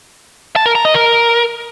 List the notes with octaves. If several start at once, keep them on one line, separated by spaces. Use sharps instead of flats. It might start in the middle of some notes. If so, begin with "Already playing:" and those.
A5
A#4
A#5
D#5
A#4